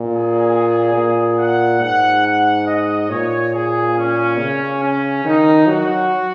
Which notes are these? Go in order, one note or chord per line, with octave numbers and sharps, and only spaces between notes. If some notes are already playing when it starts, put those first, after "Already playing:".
Already playing: A#2
G#4
A#2
F#5
G#2 F#5
F#5
D#5
A#2 C#5
G#4
C#4
C#3
C#4
D#3 D#4
F#3 F#4